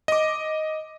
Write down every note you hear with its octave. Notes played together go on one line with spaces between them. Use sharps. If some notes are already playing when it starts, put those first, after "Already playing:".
D#5 D6